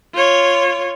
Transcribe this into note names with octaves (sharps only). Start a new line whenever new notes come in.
F4 C#5